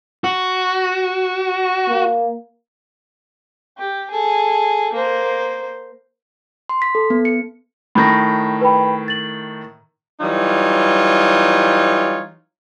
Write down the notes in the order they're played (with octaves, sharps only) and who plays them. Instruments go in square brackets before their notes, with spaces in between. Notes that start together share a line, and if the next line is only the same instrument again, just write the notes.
[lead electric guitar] F#4
[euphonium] A#3
[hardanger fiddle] G4
G#4 A4
A#3 C5
[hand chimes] C6
B6
A4
B3
C#7
[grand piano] A2 D#3 [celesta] B5 A#6
[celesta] B4 G5 B5
A6 F#7
[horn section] E3 F#3 G3 D#4 F4 C#5